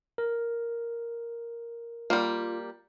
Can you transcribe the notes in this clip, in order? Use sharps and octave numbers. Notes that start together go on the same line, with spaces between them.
A#4
G3 A#3 F4